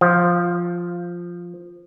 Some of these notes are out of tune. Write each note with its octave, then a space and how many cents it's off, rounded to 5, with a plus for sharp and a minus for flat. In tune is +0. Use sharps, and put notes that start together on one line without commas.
F3 +0